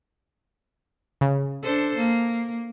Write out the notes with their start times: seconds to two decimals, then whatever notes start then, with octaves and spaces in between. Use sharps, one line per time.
1.21 C#3
1.63 D4 A4 C5
1.97 A#3